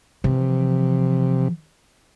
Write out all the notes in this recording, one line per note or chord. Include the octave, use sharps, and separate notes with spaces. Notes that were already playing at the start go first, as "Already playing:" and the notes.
C3 E3 F3